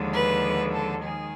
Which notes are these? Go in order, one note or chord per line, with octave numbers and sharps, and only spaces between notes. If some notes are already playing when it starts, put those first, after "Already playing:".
Already playing: D#2 D3 F3 G#3
B4
A4
D#3 G#3 G#4